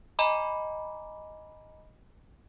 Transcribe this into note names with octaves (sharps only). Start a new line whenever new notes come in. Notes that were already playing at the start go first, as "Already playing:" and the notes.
D#5 G#5 A#5 B5 D6